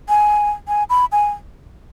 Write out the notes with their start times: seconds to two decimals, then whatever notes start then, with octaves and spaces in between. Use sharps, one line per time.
0.09 G#5
0.68 G#5
0.90 B5
1.12 G#5